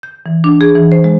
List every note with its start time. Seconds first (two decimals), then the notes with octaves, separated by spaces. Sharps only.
0.03 G6
0.26 E3
0.44 D4
0.61 G#4
0.75 E3
0.92 C5
1.04 G#3